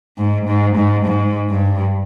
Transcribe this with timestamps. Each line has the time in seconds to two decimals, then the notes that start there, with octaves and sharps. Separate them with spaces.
0.18 G#2
0.46 G#2
0.76 G#2
1.05 G#2
1.50 G2